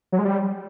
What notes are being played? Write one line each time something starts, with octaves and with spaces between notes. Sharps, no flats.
F#3
G#3
G3